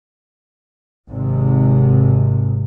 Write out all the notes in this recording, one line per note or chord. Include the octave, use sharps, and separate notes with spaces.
G#1 G#2 C3